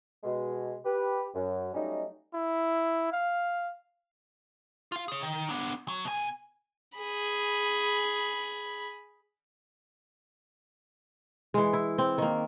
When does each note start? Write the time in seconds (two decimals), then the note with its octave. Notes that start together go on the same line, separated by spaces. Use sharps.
0.24 B2 G#3
0.85 G4 B4
1.34 F#2
1.73 F#3 G3 A3 C#4 D#4
2.34 E4
3.12 F5
4.92 F4 F5
5.08 G#4 C#5
5.21 D#3
5.49 B3 D4
5.88 F#3
6.05 B2 G#5
6.97 G#4 B5
11.54 E3 G#3
11.73 E4
11.98 C4
12.18 D#3 A#3